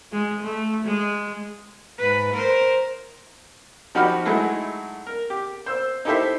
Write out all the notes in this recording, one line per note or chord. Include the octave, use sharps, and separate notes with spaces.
G#3
A3
G#3
G#2 B4
A#4 C5
F3 D#4 F#4 G4 B5 F6
F#3 G#3 A3 D#4 E4
A#4
G4
C5 E6
D#4 E4 G4 A4 C5 E5